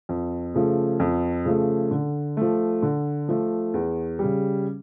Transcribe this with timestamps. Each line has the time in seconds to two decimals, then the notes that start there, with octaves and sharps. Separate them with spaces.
0.09 F2
0.55 C#3 F3 A3
1.00 F2
1.45 C#3 F3 A3
1.91 D3
2.37 F3 A3
2.82 D3
3.29 F3 A3
3.74 E2
4.19 C#3 G3